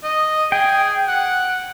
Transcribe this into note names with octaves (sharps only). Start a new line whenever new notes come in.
D#5
G#4 G5
F#5